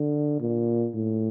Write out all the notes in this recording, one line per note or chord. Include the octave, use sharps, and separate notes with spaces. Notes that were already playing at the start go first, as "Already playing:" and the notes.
Already playing: D3
A#2
A2